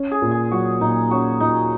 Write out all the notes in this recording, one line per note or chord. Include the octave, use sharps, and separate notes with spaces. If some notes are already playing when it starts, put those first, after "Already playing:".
Already playing: C#4
G#4
A#2
G#4
F#3 F#4
A#2 D#4
C#4 F#4
A#2 D#4